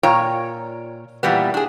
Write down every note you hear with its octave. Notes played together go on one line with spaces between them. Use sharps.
A#2 F4 C#5 G5 A#5
A#2 E3 G3 B3
D4 G#4